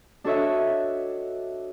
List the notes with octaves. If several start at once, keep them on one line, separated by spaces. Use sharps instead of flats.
D4 F#4 A4 C#5 D#5 E5